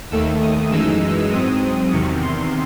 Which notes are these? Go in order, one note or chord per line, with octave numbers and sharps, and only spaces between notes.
D#2 D#3 A3 E6
D#6
F#2 E3 G#3 D#4 E6
G#2 F#3 C4 D#6
E2 C3 D#3 C#6
C6